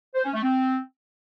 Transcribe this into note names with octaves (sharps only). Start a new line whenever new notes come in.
C5
C#4
A3
C4